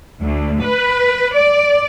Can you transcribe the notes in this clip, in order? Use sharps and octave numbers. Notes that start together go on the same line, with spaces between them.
D2
B4
D5